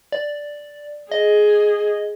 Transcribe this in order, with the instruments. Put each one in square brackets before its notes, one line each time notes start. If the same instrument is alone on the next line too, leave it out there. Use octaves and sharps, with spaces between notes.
[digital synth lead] D5
[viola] G#4 [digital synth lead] D#5